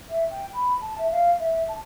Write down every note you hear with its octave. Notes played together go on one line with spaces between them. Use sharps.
E5
G5
B5
A5
E5
F5
E5
A5